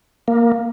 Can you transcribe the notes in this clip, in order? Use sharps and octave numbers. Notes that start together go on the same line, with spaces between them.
A#3